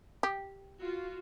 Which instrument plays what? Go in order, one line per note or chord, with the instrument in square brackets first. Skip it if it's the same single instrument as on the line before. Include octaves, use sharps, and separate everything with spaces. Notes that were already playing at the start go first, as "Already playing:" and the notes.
[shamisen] G4
[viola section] F4 F#4